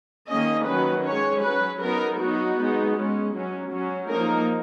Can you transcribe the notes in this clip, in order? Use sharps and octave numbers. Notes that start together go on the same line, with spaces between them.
D#3 A#3 C#4 D#5
D#3 F#3 C#4 B4
G#3 C#4 C#5
F#3 C#4 B4
F#3 B3 D#4 A#4
F#3 B3 D#4 F#4
G#3 B3 D#4
G#3 C#4
F#3 C#4
F#3 C#4
F3 A#3 D#4 A#4